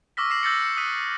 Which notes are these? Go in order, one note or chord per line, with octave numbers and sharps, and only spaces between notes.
C#6 D6 E6 F6 A#6 B6
C#6 D6 A#6 C7 E7 F#7
E6 G6 A6 A#6 C#7
C#7
D#6 F#6 B6 D#7